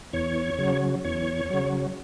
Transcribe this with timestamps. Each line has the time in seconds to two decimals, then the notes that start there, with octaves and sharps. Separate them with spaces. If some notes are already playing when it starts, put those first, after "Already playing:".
0.13 E2 C#5
0.59 C#3 F#3
1.04 E2 C#5
1.50 C#3 F#3